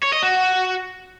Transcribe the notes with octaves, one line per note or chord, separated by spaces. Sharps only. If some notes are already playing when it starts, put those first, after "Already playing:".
C#5
D#5
F#4